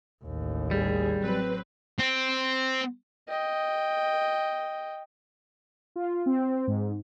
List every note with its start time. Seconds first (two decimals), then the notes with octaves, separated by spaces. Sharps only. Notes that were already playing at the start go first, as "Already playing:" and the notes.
0.24 A1 D#2
0.71 G3 G#4
1.21 F#3 C4 B4
1.99 C4
3.28 D#5 G5
5.96 F4
6.26 C4
6.67 G#2